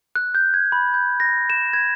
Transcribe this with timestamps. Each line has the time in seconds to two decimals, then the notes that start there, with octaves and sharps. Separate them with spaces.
0.15 F#6
0.35 G6
0.54 G#6
0.72 B5
0.94 G6
1.20 A#6
1.50 E7
1.73 G#6